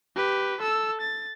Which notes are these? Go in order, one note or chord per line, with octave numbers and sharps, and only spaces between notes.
G4 B4
A4 E6
A6